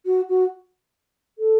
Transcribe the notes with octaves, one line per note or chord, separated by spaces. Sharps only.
F#4
F#4
A4